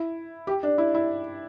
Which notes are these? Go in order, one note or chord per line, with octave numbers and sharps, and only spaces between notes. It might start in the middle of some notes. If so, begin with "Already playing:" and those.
Already playing: E4
G4
D4
E4
E4